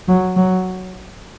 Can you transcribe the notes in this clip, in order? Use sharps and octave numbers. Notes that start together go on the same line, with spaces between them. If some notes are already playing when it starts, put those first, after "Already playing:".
F#3
F#3